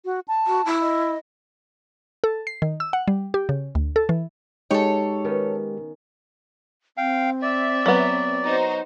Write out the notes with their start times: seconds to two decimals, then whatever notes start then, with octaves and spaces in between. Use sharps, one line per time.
0.05 F#4
0.28 A5
0.47 F#4
0.66 E4
0.81 D#5
2.24 A4
2.47 C7
2.62 D#3
2.80 E6
2.93 F#5
3.08 G3
3.34 G4
3.49 C#3
3.75 D2
3.96 A4
4.09 E3
4.71 G#3 D#4 G4 A4 C#5
5.25 D#3 B3 C#4
6.97 C4 F5 G5
7.42 D5 E5
7.86 F#3 B3
8.44 D#4 F#4 C5